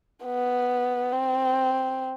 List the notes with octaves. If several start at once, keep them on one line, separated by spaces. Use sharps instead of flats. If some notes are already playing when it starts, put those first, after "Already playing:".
B3
C4